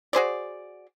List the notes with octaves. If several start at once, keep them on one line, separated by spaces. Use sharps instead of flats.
F#4 G#4 C5 D5